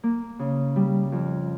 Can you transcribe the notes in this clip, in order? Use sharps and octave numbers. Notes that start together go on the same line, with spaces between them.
A#3
C#3
G3
F2